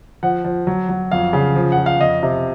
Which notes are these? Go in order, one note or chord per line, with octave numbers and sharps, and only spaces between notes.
F3 F#5
F3
F#3
F#3
F2 F5
C#3 F5
F3
F#5
F3
F5
F2 D#5
C3